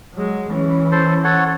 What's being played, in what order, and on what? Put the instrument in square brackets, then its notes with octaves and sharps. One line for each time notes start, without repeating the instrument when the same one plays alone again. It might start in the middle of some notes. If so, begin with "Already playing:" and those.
[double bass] F#3 G#3
E3 C#4
[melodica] A4 C5
A4 C#5 F#5